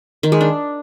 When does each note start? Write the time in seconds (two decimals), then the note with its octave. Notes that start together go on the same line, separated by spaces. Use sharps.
0.23 D#3
0.32 G#3
0.41 D4